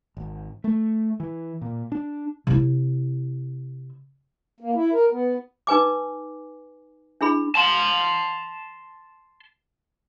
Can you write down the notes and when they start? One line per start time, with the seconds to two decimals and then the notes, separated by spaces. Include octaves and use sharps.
0.17 G#1
0.64 A3
1.20 E3
1.62 A#2
1.92 D4
2.47 C3 E4
4.60 A#3
4.75 E4
4.93 A#4
5.11 B3
5.67 D#4 B4 G#5 D6
7.21 D4 E4 G#4 B5
7.56 A5 C6